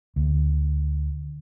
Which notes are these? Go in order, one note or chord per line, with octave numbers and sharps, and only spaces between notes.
D2